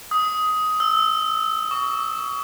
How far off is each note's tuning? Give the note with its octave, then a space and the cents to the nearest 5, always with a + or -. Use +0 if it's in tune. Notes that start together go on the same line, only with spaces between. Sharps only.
D#6 +15
E6 -10
C#6 +30